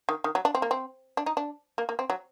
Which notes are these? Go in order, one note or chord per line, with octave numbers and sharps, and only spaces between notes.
D#3
D#3
F#3
D4
C4
A#3
C4
D4
D#4
D4
A#3
A#3
C4
F#3